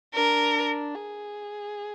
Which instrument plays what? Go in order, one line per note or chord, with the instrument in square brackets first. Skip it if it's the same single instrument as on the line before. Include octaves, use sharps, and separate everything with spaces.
[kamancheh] D4 [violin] A#4
[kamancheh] G#4